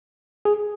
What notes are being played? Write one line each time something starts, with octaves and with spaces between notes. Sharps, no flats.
G#4